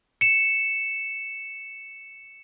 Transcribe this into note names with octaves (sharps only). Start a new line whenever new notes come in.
C#7 E7